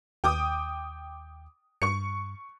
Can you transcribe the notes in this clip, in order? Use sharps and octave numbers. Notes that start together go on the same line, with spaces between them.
D#2 G5 D6 D#6
G2 C#6 C#7